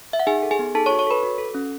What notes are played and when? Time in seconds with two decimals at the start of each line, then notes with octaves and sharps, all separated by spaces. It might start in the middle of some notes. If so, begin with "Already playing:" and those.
0.13 E5
0.20 F#5
0.27 D#4 G#4 G#5
0.43 A4
0.51 G#4 G#5
0.59 B3
0.75 D#4 A4 A5
0.86 C#5 C#6
0.91 F#4
0.99 C#5 C#6
1.07 A4 B4 B5
1.23 F#4
1.38 A4
1.55 C#4